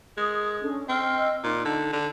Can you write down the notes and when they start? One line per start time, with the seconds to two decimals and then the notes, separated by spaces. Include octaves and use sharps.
0.17 G#3 A#4 D#6
0.61 C#4 D4 A4
0.89 C4 D#5 E6 F6
1.44 A#2 D#4
1.65 D3
1.93 D3